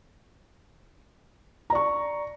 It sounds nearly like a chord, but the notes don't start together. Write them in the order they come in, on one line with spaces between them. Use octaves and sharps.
A#5 D5 C#6